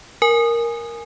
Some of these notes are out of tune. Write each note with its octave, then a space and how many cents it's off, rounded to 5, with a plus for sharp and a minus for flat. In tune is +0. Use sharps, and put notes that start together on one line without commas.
A#4 +0 G#5 +0